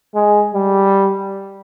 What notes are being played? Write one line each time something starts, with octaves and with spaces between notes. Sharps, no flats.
G#3
G3